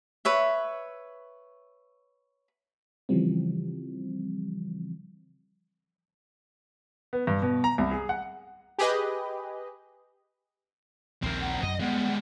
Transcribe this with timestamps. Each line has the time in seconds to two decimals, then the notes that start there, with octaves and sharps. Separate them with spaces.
0.25 B4 C#5 E5
3.09 C#3 E3 F3 G3 C4
7.13 B3
7.27 G2
7.42 B2
7.64 A#5
7.78 C2
7.91 G#4
8.09 F#5
8.78 G4 G#4 B4 D#5
11.23 A#1 D#2 C4 A#4
11.41 F#5
11.63 F#2 D#5
11.81 G3 G#3 B3 F#5